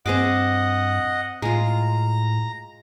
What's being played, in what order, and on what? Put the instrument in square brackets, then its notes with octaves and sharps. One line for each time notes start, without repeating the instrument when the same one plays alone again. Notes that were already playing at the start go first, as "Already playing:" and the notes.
[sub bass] G2 [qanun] C4 G#4 D6 [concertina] D#5 F#5
[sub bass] A2 [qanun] G#3 F4 [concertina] A#5